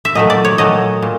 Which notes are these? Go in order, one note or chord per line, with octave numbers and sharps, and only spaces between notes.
E5
A#2 F#3 A3 D#5
D5
C#5
A#2 F#3 A3 D#5
A#2